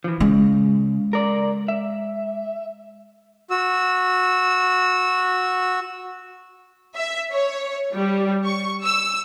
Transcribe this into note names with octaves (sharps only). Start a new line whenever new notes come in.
E3 F3
C#3 G#3
A#4 D5
E5
F#4 E6
E5
C#5
G3
C#6
E6